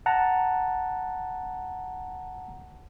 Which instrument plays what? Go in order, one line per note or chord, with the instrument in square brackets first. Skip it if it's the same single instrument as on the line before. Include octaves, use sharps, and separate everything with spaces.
[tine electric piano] F#5 A5 A#5